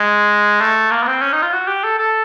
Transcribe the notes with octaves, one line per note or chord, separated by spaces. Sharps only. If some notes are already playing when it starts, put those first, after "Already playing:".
Already playing: G#3
A3
A#3
B3
C4
C#4
D#4
F4
F#4
G4
A4
A4